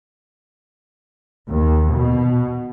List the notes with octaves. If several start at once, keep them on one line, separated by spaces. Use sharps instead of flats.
D#2
B2